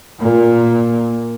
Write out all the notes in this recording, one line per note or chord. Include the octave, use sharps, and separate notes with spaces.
A#2